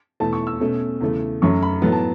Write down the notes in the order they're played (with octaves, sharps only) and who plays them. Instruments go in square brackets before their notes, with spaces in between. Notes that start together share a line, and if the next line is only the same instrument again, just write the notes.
[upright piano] E2 B2 A3 A5
C#6
E6
B2 A3 C#4
E2 C#3 A3
F#2 F#3 A3 C#4 C#6
B5
A2 F#3 B3 A4
A5